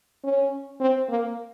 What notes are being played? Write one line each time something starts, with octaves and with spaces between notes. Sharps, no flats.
C#4
C4
A#3